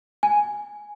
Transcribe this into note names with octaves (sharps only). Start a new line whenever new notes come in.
G#5